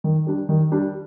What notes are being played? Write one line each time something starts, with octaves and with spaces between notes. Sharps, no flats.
D#3
G3 D4
D#3
G3 D4